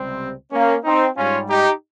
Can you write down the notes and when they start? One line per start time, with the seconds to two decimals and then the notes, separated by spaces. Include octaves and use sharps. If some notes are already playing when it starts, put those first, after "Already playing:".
Already playing: C#2 C3 G3 C4
0.52 A#3 C#4
0.84 C4 D#4
1.17 G#2 G3 C#4 F4
1.49 D#4 G4